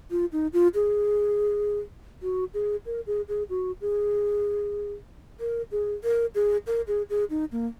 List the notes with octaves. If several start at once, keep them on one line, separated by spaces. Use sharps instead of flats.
F4
D#4
F4
G#4
F#4
G#4
A#4
G#4
G#4
F#4
G#4
A#4
G#4
A#4
G#4
A#4
G#4
G#4
D#4
A#3